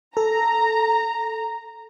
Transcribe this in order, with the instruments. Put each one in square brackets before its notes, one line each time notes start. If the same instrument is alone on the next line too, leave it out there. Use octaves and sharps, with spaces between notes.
[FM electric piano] A4 [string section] A#5